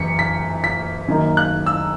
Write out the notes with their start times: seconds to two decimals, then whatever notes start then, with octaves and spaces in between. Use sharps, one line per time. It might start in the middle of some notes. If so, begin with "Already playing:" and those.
Already playing: F#1 F#2 E3 B6 C#7
0.19 B6
0.64 B6
1.08 F#2 D#3 A#3
1.37 F#6
1.66 E6